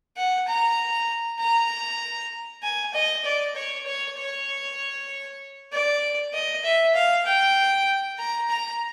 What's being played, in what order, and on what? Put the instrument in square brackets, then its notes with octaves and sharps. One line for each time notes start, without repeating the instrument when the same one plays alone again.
[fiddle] F#5
A#5
A#5
G#5
D#5
D5
C#5
C#5
C#5
D5
D#5
E5
F5
G5
A#5
A#5